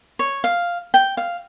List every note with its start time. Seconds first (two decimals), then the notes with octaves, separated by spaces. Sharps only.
0.19 C#5
0.44 F5
0.94 G5
1.17 F5